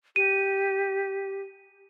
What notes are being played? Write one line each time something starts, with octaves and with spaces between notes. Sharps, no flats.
G4 D#7